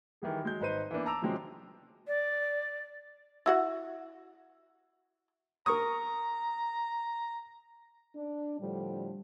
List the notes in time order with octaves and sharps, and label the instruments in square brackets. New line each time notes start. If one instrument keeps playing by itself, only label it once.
[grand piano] D#3 E3 G3 G#4
F#3 G#3 G6
G#1 D#4 B4 C5 D#7
E3 A#3 B3 D4
A5 A#5 D6 E6 F7
C3 F3 F#3 G#3 C4 C#4
[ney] D5
[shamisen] E4 F#4 F#5
[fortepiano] A#4 C#6 D#6 [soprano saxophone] A#5
[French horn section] D4
A2 D3 F3 G3